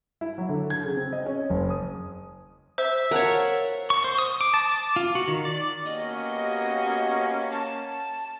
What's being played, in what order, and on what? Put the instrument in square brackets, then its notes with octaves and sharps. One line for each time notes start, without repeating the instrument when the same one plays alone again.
[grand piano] E4
F#3
D3
G#6
C#3
C4
D#5
C#4
F#1
D#6
[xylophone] C5 [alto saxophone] E5
[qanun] A#4 C#5 [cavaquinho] F5 F#5 A5
[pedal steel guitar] C#6
C5
D#6
D6
A5
D6
F4
F#4
D#3
D5
[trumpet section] A#3 C#4 [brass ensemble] B3 F#4 G4 [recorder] D#5
[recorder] A5